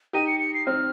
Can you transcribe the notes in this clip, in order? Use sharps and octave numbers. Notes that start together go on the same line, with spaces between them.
D#4 G4 D#7
C#7
C#7
C7
C4 D#4 F6